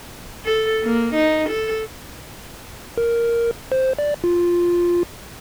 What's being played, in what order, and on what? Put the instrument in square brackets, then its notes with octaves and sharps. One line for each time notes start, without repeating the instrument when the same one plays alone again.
[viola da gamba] A4
A#3
D#4
A4
[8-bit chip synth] A#4
C5
D5
F4